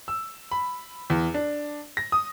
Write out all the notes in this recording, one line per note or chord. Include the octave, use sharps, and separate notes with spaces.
E6
B5
E2
D4
A#6
D#6